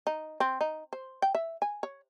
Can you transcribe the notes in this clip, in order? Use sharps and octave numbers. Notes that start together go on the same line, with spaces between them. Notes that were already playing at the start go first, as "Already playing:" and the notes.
D#4
C4
D#4
C5
G5
E5
G#5
C#5